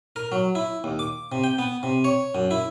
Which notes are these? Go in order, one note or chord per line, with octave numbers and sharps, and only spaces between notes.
A#4
F#3
E4
D#2
D6
C3
G5
B3
C3
C#5
F#2
E4